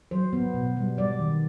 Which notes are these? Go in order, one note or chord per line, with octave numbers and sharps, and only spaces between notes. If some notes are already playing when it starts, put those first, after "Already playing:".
F#3 C5
B3
B2
G3
G3 D5
D#3